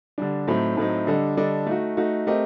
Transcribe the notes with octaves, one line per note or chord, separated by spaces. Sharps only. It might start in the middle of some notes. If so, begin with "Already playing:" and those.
D3 G3 D4
A2 F#3 A3 C4 D#4
A2 F#3 A3 C4 D#4
D3 G3 D4 A4 D#5
D3 G3 D4 A4 D#5
A3 D#4 F#4
A3 D#4 F#4
A3 C4 G4 A#4 D#5